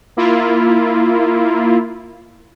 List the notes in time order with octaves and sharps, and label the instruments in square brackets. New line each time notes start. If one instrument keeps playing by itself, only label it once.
[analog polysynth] A#3 E4 F4